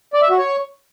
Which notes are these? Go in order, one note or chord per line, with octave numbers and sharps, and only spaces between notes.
D5
E5
F#4
C#5